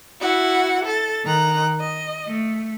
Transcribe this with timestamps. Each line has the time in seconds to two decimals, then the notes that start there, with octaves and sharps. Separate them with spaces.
0.21 E4 F#4 F#5
0.85 A4 A6
1.24 D#3 A#5 F#6
1.80 D#5
2.27 A3